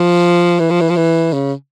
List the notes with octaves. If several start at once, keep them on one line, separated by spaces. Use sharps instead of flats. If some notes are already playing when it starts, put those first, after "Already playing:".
Already playing: F3
E3
F3
E3
F3
E3
C#3